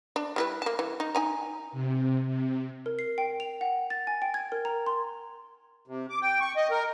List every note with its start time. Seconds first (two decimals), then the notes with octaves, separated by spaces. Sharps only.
0.16 D4
0.36 G3 E4 B4
0.62 A#3 A5
0.79 E3
1.00 D#4
1.15 D#4 G#5 A#5
1.72 C3
2.26 C3
2.86 A#4
2.99 C7
3.18 G5
3.40 F7
3.61 F#5
3.90 A6
4.07 G#5
4.22 G5
4.34 G#6
4.52 A#4
4.65 A#5
4.86 C6
5.88 C3
6.10 D6
6.22 G5
6.41 C#6
6.56 D#5
6.71 A#4